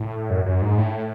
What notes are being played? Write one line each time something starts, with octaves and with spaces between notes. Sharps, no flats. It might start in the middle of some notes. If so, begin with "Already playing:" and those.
Already playing: A2
F#2
F#2
G#2
A2